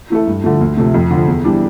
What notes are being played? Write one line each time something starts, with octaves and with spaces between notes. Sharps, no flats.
E3 A3 E4 A4
G2
D3 F3 A3
D2
C3 F3 A3
F2
D3 F3
E2
E3 G3 D4